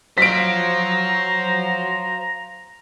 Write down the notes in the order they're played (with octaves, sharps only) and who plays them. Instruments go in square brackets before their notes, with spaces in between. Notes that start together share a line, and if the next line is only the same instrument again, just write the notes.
[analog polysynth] F#3 [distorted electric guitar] C5 F5 [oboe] A#5 [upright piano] B6 D7